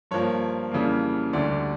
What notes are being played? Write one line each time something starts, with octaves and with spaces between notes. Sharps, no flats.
G2 F3 A#3 C#5
F2 C#3 E3 G3 A#3
D2 D3 G3 D5